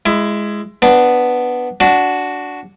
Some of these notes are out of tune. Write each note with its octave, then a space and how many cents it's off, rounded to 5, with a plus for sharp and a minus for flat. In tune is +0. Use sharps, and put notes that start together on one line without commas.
G#3 +0 E4 +20
B3 +0 D4 +0
D4 -15 F#4 +0